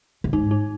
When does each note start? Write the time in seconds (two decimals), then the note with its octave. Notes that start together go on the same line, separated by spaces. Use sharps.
0.24 A2
0.33 G#2 D#4
0.51 D#4